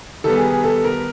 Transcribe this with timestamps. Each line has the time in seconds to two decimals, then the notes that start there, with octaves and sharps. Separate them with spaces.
0.24 D#3 G3 B3 A4
0.37 G#4
0.50 G#4
0.64 A4
0.85 A#4